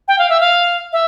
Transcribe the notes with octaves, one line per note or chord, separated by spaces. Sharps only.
G5
F5
E5
F5
E5